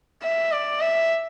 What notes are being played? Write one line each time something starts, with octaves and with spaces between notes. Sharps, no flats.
E5
D5
E5